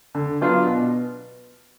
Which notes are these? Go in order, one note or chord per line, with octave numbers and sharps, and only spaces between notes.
D3
F#3 B3 D4 F4
B2